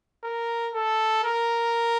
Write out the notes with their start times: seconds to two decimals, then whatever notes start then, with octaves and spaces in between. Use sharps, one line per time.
0.24 A#4
0.74 A4
1.24 A#4